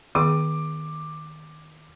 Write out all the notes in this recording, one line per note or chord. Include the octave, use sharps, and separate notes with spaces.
D#3 B3 G#4 D6